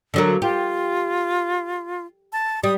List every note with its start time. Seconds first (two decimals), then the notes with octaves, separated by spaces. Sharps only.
0.14 D3 F#3 A#3
0.42 F4 G4
2.33 A5
2.64 G3 D#6